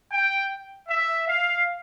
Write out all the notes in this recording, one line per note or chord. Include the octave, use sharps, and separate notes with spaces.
G5
E5
F5